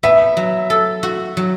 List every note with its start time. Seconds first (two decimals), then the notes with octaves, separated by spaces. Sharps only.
0.03 B3 E5
0.37 F#3
0.70 A4
1.03 F#4
1.37 F#3